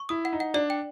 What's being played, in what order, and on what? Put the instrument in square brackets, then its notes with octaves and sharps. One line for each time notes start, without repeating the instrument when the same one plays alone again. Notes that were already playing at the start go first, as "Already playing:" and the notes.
Already playing: [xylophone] C#6
[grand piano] E4 [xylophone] D#6
[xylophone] F#5
[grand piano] D#4
[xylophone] F#5
[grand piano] D4 [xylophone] D5
[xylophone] G5